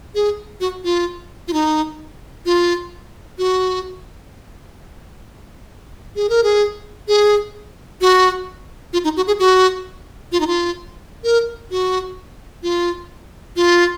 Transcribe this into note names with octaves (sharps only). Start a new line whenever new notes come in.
G#4
F#4
F4
F4
D#4
F4
F#4
G#4
A#4
G#4
G#4
F#4
F4
D#4
F#4
G#4
F#4
F4
D#4
F4
A#4
F#4
F4
F4